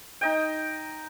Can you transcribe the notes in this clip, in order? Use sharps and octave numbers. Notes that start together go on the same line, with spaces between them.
D#4 D#5 G5